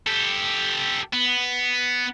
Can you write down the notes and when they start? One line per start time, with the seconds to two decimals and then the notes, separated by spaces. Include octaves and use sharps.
0.06 G4 A4
1.13 B3